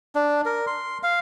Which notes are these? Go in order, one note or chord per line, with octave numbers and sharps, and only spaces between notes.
D4
A#4
C6
F5